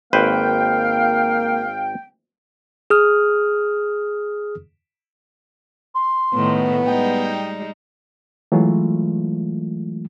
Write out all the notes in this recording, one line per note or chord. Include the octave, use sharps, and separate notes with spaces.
G#1 A#3 B4 C5 F5 G5
G#4 D#6 F6
C6
A2 D#3 B3
G3 G#3 D#4 G5
E3 F#3 G#3 A3 F4